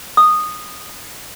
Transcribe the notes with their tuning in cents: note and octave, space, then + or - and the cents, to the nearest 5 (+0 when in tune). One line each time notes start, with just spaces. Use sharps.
D#6 -10